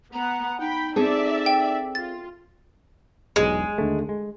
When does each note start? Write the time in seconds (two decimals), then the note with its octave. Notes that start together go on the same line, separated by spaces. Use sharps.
0.13 B3 F#5 A#5
0.60 D#4 G5 B5
0.96 C4 G#4 A4 D5 E5
1.46 G5
1.95 F4 A6
3.36 E1 B1 G#3
3.78 D#2 D3 A3
4.09 G#3